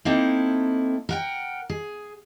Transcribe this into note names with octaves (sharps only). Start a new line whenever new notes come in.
A#3 C4 D#4 E4 A4
A#4 F#5 G5
G#4